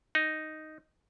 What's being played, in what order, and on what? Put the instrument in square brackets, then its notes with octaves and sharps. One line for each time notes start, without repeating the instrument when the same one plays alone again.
[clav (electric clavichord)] D#4